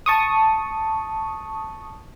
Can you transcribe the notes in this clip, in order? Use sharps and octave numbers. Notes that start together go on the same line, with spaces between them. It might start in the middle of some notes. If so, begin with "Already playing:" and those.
A5 C#6 D#6